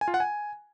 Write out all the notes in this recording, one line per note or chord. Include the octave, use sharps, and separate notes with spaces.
G#5
F4
F#5
G#5